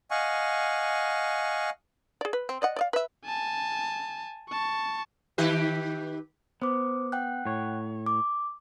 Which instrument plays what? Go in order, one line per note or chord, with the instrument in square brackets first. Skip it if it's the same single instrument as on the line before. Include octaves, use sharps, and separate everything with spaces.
[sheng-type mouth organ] D#5 F5 F#5 G#5 C#6
[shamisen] G#4 D5
B4
C4
D5 D#5 F#5
D5 D#5 F5
B4 E5
[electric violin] G#5 A5
A5 C#6
[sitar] D#3 G4 B4
[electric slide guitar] B3 [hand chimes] C5 D6
[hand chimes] F#5 G5 F#6
[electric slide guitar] A2 C#5
[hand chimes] D6